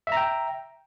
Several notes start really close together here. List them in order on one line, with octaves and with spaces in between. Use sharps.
E5 A#5 G5